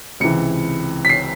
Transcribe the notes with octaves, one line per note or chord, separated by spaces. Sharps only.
C#2 C3 E3 C#7
B6
C7